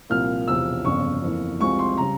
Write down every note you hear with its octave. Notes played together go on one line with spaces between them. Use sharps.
C2 A#2 F3 A#3 F6
E1 E2 C3 F3 E6
G1 F2 C#3 C#6
F2 E3 A#3
C2 C3 F3 G#3 C#6
C6
C#3 G3 A#5